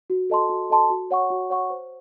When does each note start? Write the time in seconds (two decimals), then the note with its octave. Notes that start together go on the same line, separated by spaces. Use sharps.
0.10 F#4
0.30 A4 D#5 A5 C6
0.50 F#4
0.70 A4 D#5 A5 C6
0.90 F#4
1.11 C#5 F#5 C#6
1.30 F#4
1.50 C#5 F#5 C#6
1.70 C5